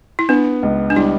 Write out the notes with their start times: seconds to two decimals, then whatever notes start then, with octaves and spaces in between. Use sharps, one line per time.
0.19 E4
0.29 B3 D4
0.63 C#2
0.90 D4
0.96 G3 E4